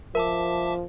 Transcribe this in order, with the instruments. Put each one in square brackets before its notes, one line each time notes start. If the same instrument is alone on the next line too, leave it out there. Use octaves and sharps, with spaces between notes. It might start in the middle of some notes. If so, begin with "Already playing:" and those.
[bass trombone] F3 [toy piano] A#4 [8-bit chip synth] E5 A5 D6